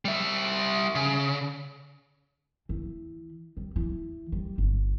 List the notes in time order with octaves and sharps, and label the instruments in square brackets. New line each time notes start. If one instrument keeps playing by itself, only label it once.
[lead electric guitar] G3 E5
C#3
[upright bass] E3
G3
E3
G3
G1